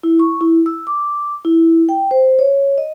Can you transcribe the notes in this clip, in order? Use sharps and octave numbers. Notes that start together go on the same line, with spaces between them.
E4
C#6
E4
E6
D6
E4
G5
C5
C#5
D#5